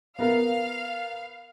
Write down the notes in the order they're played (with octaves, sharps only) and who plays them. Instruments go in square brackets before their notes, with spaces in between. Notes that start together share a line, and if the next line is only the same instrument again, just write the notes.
[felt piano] B3 A#4 [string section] F5